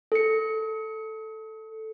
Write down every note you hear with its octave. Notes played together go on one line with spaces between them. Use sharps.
A4 C#7